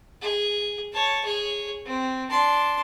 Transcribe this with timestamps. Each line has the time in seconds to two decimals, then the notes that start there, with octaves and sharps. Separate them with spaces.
0.21 G#4
0.92 C#5 A5
1.25 G#4 C#5
1.86 C4
2.30 D4 C6